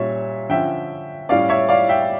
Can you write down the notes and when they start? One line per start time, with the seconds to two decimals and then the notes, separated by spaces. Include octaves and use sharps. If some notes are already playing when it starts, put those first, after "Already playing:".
Already playing: A#2 G3 C#4 C#5 E5
0.49 D3 F3 C#4 E5 G5
1.29 A2 G3 C#4 D5 F5
1.49 C#5 E5
1.69 D5 F5
1.89 E5 G5